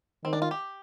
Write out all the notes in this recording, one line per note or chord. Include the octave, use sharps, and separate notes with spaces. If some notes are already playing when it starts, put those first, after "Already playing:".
D#3 C4
D4
F4
G4